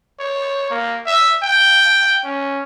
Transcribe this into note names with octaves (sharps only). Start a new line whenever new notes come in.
C#5
A#3
E5
G5
C#4